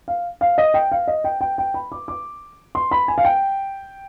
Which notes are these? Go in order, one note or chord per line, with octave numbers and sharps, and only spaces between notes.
F5
F5
D#5
G5
F5
D#5
G5
G5
G5
B5
D6
D6
C6
B5
G#5
F5
G5